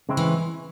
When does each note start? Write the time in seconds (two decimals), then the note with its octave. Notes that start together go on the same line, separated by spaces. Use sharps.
0.09 C#3 G#3 C4 E4
0.17 E3